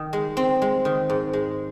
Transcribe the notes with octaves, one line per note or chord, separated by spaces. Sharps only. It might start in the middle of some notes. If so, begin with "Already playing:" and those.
Already playing: D#3
G#3
C4
G#3
D#3
G#2
G#3